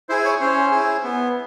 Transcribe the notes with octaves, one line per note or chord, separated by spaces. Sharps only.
E4 G#4 C5
C#5
C#4 C5
E4 G#4
B3